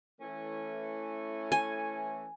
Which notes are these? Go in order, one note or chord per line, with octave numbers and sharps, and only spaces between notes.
E3 A3 C#4
G#5